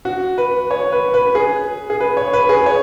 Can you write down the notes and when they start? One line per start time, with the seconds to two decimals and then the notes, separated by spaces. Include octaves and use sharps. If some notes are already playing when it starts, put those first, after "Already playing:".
0.05 F#4
0.38 B4
0.71 C#5
0.92 B4
1.14 B4
1.35 G#4
1.90 G#4
2.00 B4
2.17 C#5
2.33 B4
2.49 G#4
2.66 C#5